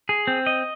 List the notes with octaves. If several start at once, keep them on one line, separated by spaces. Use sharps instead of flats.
G#4
C4
D#5